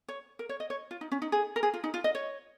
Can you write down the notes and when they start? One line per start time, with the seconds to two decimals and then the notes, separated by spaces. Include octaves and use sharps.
0.08 C#5
0.39 A#4
0.49 C#5
0.60 D#5
0.70 C#5
0.91 F4
1.01 D#4
1.12 C#4
1.22 D#4
1.32 G#4
1.56 A#4
1.63 G#4
1.74 F4
1.84 D#4
1.94 F4
2.04 D#5
2.15 C#5